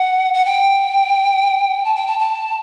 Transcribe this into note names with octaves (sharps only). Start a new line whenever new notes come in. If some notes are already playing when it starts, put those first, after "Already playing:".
Already playing: F#5
F#5
G5
A5
G5
A5
A5